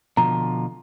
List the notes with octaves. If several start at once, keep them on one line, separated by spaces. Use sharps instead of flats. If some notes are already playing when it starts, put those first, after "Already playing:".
B2 D3 F3 A#5